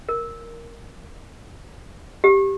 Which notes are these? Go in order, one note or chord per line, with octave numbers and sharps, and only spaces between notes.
A#4
G4